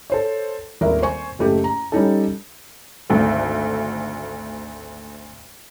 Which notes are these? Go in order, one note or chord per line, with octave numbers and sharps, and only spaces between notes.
A4 C5 C#5
D#1 G#1 A#4 E5
C5 G#5 C#6
F#1 A3 G4
A#5
G3 C#4 D#4 A4
G#1 D2 A3